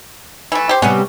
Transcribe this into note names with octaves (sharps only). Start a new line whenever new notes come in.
E3 A3
G4 C5
C3 G3 B3 C#4